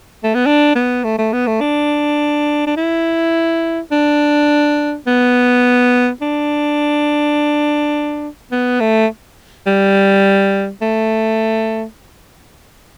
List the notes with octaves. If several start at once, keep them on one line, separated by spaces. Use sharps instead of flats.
A3
B3
D4
B3
A3
A3
B3
A3
D4
D4
E4
D4
B3
D4
B3
A3
G3
A3